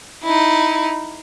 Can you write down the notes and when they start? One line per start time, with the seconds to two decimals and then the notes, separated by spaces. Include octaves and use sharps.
0.23 D#4 E4